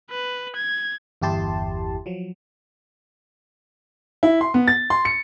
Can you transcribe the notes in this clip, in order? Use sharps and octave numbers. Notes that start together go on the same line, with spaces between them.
B4
G#6
G1 E2 E4 G4 A5 C6
F3 F#3
E4
C6
B3
A6
C6
C#7